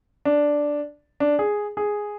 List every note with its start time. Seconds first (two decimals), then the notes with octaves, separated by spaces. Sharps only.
0.25 D4
1.20 D4
1.39 G#4
1.77 G#4